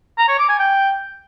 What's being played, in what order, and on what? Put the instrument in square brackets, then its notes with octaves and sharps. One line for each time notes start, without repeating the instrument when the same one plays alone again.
[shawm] A#5
C#5
D6
G#5
G5